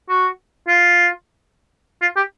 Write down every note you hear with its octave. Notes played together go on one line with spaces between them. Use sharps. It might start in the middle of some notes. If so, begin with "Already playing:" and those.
F#4
F4
F4
G4